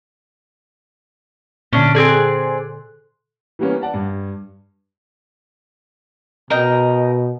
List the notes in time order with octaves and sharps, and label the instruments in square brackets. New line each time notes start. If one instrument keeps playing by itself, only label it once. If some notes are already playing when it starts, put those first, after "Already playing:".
[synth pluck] A#2 D3 [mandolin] C#4 D4
[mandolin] C4 G#4 D5 [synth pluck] A4 C6
[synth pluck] F#6
[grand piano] E3 G3 A#3 B3 C#4
D5 F#5 A5
G2
[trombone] B2 [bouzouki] A#4 D#5 G5